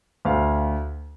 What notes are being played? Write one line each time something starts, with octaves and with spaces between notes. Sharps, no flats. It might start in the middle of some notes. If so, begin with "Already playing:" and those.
D2 F5